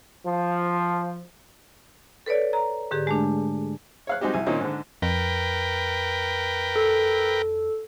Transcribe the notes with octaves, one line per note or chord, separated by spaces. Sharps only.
F3
A4 B4 C#5 D5
A#5
G#2 D3 G4 G#4
G#3 A3 D4
C#5 F5 F#6
G3 G#3 C4 D#4 F#4 G4
C2 G#5
A#2 D#3 C4 C#4 D#4
G#2 D3
F2 A#4 B4 G5
A4